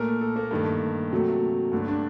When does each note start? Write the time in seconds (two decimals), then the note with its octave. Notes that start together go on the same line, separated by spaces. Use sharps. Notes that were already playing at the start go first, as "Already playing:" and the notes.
Already playing: A#2 A3 A#4
0.21 A4
0.36 A#3
0.51 G2 D#3 A3
1.11 C3 F#3 A3
1.72 G2 D3 A3
1.88 D4